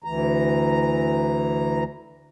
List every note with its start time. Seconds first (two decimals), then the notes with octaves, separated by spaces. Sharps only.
0.04 D2 E3 A#5